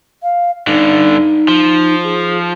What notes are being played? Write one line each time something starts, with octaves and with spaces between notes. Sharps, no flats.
F5
G2 D3 D#4
F3
G#4